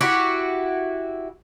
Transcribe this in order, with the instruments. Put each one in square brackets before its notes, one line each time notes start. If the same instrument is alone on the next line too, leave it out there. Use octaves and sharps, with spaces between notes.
[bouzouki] E4 F#4 G4